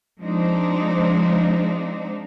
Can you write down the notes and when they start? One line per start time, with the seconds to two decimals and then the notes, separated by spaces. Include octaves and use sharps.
0.20 F3 G#3 C4 D4 D#4